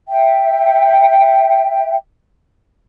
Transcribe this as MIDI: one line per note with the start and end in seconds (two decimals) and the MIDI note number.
0.08 1.95 76
0.08 1.95 79